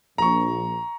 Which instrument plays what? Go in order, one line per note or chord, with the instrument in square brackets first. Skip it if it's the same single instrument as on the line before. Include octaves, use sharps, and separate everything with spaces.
[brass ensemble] A#1 [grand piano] A#5 C#6